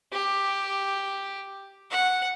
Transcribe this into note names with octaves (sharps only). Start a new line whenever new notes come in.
G4
F#5